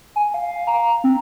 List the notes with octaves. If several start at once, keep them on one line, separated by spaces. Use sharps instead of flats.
G#5
F5
A#5
C4